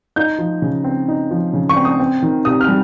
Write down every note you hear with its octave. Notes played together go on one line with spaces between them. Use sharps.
D#4 G6
F3
C#3
C4
D#4
F3
C#3
C#6
C4
D#6
C4
D#3
C3 D#6
F6
G3